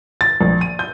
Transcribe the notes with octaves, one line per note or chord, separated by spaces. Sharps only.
A6
A#1
D#7
G6